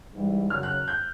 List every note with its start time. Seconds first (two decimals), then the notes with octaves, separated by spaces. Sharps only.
0.13 G#2 E3 G3
0.50 F#2 C#3 F#3 F6
0.63 F#6
0.88 G6